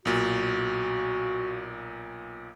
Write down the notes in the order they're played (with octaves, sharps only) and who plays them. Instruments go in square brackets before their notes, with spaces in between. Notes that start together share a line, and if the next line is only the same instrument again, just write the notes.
[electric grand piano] B1 A#2 [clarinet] F#4